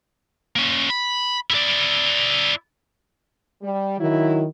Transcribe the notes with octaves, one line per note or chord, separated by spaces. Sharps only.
A#3 C#4
B5
E4 D5
G3
D#3 F#3 E4